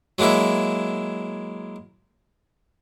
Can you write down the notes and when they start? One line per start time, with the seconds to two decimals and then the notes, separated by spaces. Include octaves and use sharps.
0.18 F#3 G#3 A#3 E4 E5